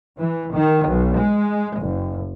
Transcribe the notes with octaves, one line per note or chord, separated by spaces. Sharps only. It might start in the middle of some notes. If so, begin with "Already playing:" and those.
E3
D#3
B1
G#3
F#1